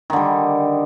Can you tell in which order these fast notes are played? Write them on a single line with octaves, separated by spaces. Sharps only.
D#3 D3 G3